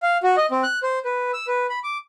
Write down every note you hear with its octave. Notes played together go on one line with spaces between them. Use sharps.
F5
F#4
D#5
C4
F#6
C5
B4
E6
B4
B5
D6